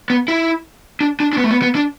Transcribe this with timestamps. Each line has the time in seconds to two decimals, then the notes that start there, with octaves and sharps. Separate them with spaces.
0.10 B3
0.28 E4
1.01 D4
1.20 D4
1.33 D4
1.38 B3
1.44 A3
1.51 B3
1.62 B3
1.75 D4